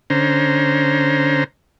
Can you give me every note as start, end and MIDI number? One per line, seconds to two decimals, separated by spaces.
0.10 1.44 50
0.10 1.44 61
0.10 1.44 72
0.10 1.44 82